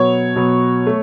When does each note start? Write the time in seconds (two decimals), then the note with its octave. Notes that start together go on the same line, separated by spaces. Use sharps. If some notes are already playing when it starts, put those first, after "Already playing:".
Already playing: B2 F#3 B3 C#5
0.36 B2 F#3 B3
0.87 A3